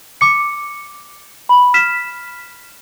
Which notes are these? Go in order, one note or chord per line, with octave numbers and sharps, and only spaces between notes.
D6 C#7
B5
F6 B6 E7